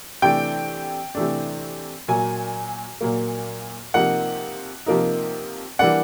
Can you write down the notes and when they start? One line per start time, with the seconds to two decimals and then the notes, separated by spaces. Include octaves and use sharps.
0.22 C3 E3 A3 D4 G5
1.15 C3 E3 A3 D4
2.08 A#2 F#3 A#3 G#5
3.01 A#2 F#3 A#3
3.94 C3 F3 A#3 D#4 F#5
4.86 C3 F3 A#3 D#4
5.79 E3 G3 A#3 D4 F#5